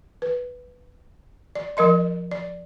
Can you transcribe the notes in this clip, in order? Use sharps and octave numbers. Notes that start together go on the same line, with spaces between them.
B4
D5
F3 A#4 D#5 C6
D5